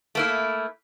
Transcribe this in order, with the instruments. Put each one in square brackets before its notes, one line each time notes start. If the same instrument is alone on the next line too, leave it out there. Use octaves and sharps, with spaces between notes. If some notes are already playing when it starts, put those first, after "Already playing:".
[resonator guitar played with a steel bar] A3 A#3 E4